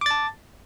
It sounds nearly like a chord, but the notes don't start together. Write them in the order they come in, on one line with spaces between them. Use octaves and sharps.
D6 A6 A5